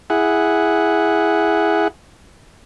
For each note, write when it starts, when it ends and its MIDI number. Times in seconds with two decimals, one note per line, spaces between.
0.10 1.88 64
0.10 1.88 68
0.10 1.88 78